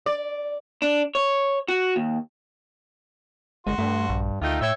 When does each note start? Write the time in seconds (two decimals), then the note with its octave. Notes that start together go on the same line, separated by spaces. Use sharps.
0.06 D5
0.82 D4
1.15 C#5
1.68 F#4
1.96 D#2
3.67 G1 G#3 F#4 C6
3.78 G2 A3
4.09 A#1
4.42 D2 D#3 A3 D#4 F4 G5
4.61 A2 C#5 E5 G5 E6